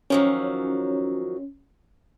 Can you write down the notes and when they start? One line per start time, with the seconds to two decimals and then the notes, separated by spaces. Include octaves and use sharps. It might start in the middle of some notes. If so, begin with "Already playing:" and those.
0.10 D#3 F3 F#3 C#4